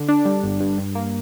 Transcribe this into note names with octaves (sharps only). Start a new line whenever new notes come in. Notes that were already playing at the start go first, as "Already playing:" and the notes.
Already playing: D3
D4
G3
G1
G2
G2
A#3